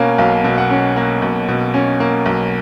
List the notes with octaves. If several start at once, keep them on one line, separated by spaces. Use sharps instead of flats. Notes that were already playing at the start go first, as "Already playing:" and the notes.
Already playing: B2 A#3 C#4 F5
B1 F5
B2
F#5
C#4
A#3
B1
B2
C#4
A#3
B1